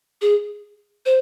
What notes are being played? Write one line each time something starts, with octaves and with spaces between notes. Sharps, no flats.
G#4
C5